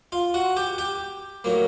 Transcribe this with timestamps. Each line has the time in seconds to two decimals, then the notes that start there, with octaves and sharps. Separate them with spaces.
0.12 F4 F5
0.34 F#4 F#5
0.57 G4 G5
0.78 G4 G5
1.44 A2 F#3 A#3